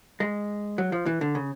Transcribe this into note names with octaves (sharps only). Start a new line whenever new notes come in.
G#3
F#3
F3
E3
D3
C#3